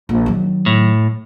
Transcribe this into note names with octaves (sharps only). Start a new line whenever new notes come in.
A#1
D#3 F#3
A2